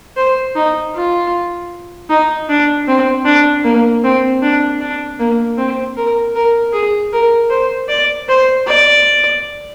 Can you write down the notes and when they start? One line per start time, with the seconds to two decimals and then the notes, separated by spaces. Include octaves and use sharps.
0.16 C5
0.55 D#4
0.95 F4
2.09 D#4
2.49 D4
2.88 C4
3.25 D4
3.64 A#3
4.04 C4
4.42 D4
4.81 D4
5.19 A#3
5.58 C4
5.97 A#4
6.35 A#4
6.73 G#4
7.12 A#4
7.50 C5
7.89 D5
8.29 C5
8.67 D5